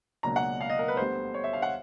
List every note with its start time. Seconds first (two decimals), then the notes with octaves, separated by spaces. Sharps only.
0.23 C#2 B2 F#3 A#3 D4 A#5
0.36 F#5
0.61 F5
0.69 D#5
0.79 A#4
0.88 B4
0.97 D2 D3 G3 B3 C5
1.34 C#5
1.44 E5
1.53 F5
1.62 F#5